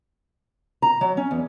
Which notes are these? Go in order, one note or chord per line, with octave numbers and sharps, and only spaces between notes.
A#5
F#3
C#4
E2